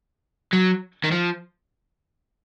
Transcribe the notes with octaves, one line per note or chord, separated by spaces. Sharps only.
F#3
D#3
F3